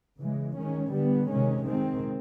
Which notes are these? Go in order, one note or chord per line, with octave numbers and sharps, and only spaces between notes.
C#3 E3 G#3
D#3 G#3 C#4
D3 G3 B3
C3 D#3 G#3 C#4
D#3 G#3 C4